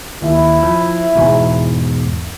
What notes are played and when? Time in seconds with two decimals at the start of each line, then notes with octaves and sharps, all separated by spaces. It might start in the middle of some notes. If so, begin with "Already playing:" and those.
0.22 D#2 E4
0.63 F3
1.16 E2 G#2 B2